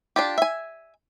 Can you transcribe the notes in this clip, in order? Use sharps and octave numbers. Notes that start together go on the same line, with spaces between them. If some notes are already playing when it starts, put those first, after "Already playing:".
D4 F4 G4
E5 G#5